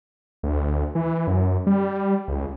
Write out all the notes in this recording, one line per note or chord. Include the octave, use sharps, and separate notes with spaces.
D2
E3
F#2
G3
C#2